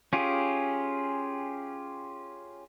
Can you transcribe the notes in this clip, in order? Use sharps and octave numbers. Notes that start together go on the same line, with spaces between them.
C#4 F4 G4 G#4